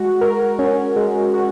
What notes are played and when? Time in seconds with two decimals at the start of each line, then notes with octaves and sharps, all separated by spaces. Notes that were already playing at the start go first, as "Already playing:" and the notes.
Already playing: G#3 F#4
0.21 A#4
0.59 C#4
0.96 G#3
1.34 F#4